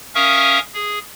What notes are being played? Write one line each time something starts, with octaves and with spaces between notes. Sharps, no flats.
C#4 A#4 E5 F5 C#6 D#6
G#4